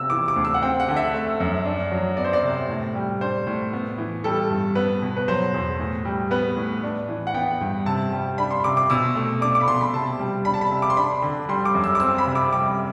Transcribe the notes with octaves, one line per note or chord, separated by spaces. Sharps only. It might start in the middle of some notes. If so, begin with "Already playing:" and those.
Already playing: C3 B3 E6
E3 D6
D6
D2
E6
F#5
C4 G5
F#5
D3
E5
A3
F#2
D4
F#3
B3 D5
C5
D5
C3
A2
G3
D4 C5
A2
B3
E3
G3 A4
G2
B3 B4
B2
B4
F#3 C5
E2
A2
G3
B3 B4
A2
D4
E3
F#5
B3 G5
G2
C3 A5
G3
D4 B5
C6
C3 D6
D6
B2 E6
A3
D4 D6
D6
B5
B2 C6
B5
C3 A5
G3
D4 B5
A5
B5
C3
D6
C6
D4 B5
D3
G3 C6
D6
F#2
E6
D6
C4 E6
B5
C3
D6
G3 D6